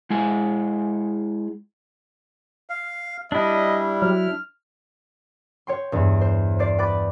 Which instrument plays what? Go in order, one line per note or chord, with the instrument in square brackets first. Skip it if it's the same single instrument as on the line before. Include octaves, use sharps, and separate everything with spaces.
[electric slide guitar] G#3 E4 G#4 G#5
[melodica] F5
[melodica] G3 [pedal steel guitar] D4 E4 [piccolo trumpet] D#5
[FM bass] F#3 [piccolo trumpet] F6
[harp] C#5 G5 C6
E2 G2
C5
C5 D5 C7 D7
B4 G5 B5 D6 A6